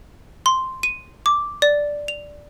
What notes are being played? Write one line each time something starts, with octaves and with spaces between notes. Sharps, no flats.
C6
D#7
D6
D5
F7